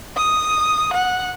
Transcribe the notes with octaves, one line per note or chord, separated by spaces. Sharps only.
D#6
F#5